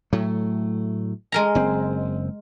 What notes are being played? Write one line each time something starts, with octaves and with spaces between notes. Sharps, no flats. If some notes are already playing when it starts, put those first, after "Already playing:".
A2 F#3 A3
G#3 A#4 A#5
F#1 C4